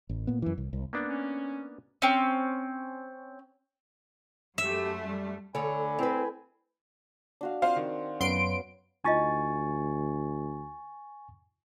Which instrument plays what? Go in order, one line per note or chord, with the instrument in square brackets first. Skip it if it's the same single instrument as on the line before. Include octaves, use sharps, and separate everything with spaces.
[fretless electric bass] A1
A#2 B3
F#2 E3
C2
C2
[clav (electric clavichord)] A#3 B3 D4
[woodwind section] C#4
[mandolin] C4 C#4
[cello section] F#2 A3 [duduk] G4 [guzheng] E5
[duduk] G3
[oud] D2 D3 C#5 [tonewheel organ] A4 [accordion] G#5 B5
[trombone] C4 [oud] E4 B4
[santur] D4 F#4 F5
[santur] C4 [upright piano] F4 C5 F5
[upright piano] D#3
[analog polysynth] F#2 C6 D7 [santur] B3 C#4 B4
[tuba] D2 [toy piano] D#4 F4 D#5 [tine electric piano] G#5 C#6 A6